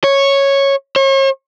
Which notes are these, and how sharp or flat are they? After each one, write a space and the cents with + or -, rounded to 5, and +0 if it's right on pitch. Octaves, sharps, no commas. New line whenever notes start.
C#5 -5
C#5 -40